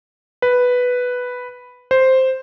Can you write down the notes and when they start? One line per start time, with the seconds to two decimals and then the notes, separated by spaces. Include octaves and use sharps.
0.42 B4
1.91 C5